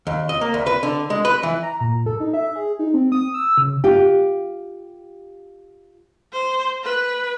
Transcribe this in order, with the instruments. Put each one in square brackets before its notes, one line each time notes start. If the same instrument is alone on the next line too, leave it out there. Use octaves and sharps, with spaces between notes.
[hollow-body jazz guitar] D#2
D#5
A#3
D2
B4
D3
G#3
B4
E3
[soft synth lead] A#5
A#2
A4
D#4
E5
G#4
D#4
C4
D#6
E6
C#3
[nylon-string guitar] F4 G4
[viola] C5
B4